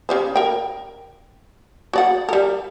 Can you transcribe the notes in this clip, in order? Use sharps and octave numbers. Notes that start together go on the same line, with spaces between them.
C#3 G4 C5
A#4 G5
F#4 D5 F#5
G3 A#4